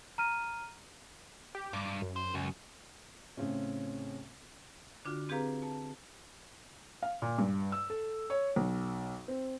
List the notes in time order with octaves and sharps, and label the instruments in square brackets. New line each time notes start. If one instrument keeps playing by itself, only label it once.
[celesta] A#5 F6 D#7
[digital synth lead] G4
[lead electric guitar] G2 [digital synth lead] D6
[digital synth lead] F#2
[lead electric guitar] C5
[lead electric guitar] C#2 [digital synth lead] F#2
[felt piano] A2 C#3 C4 C#4
[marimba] D3 D4 F4 F#4
C4 G4 G#4 B4 F5 A#5
A5
[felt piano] F5
A#2
G2
E6
A4
C#5
B1
C4